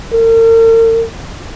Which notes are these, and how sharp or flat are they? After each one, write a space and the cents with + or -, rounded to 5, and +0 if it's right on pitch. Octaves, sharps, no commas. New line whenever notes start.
A#4 -45